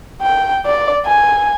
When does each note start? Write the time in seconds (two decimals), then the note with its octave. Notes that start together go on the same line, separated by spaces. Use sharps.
0.21 G5
0.66 D5
1.06 G#5